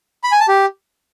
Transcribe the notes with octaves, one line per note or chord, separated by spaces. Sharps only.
B5
G#5
A5
G4